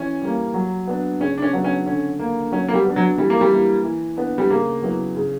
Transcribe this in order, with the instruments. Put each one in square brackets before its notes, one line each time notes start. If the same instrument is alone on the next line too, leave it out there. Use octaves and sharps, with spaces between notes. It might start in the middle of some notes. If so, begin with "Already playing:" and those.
Already playing: [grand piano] E3 [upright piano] C#4
[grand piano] G3 A#3
F#3
B3 D4
[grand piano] C#3 [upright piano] C#4
[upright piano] D4
C#4
[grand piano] F#3 B3 D4
[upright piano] C#4
[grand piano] D3 [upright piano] C#4
[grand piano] A#3 D4
[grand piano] F#3 [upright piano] C#4
[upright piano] A#3
G3
[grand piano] B3 D4
[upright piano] F#3
[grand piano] E3 [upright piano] G3
[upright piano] A#3
G3
[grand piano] A#3 E4
E3
B3 D4
[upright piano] G3
[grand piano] C#3 [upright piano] A#3
[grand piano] F#3 B3 E4
C#3